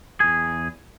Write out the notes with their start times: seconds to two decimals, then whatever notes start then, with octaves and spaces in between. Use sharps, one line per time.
0.20 E2 G#4